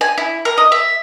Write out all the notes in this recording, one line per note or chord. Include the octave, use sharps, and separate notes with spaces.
G#5
E4
A#4
D#5
E5